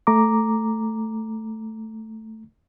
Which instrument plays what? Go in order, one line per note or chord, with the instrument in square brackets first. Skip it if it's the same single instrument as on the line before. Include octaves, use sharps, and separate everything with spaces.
[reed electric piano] A3 A#5 D6